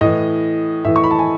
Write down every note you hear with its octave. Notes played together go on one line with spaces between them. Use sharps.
A2 E3 D#5
A2 E3 E5
C#6
B5
A5
G#5